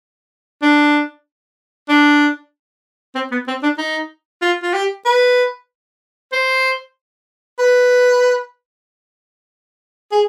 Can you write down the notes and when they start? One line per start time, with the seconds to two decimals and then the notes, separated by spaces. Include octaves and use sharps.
0.62 D4
1.89 D4
3.15 C4
3.32 B3
3.47 C4
3.63 D4
3.78 D#4
4.42 F4
4.63 F4
4.74 G4
5.05 B4
6.33 C5
7.59 B4
10.12 G#4